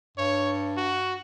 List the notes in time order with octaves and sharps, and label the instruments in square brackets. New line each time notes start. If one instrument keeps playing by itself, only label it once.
[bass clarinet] G2 [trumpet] C#5
[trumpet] F#4